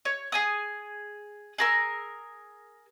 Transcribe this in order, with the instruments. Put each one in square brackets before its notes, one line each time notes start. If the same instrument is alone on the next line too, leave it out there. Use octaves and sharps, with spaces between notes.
[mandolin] C#5
G#4 G#5 D#6
G#4 A#4 E6